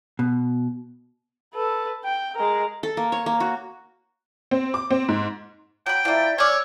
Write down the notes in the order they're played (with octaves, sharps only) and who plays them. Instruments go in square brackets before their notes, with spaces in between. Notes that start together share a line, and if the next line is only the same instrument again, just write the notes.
[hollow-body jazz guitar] B2
[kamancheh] A4 B4
G5
G#3 A#4
[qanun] A4
A#3
C#5
A#3
F#4
[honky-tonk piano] C4
D6
C4
G#2
[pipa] F#3 B5 [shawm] G5
[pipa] F3 A#3 [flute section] E4 D5
[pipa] C#4 D5 [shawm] C#5 [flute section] E6 F6